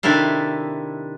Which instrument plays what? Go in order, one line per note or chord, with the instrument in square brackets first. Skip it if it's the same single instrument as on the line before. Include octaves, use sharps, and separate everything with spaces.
[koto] C3 D#3 D4 E4 A4 F5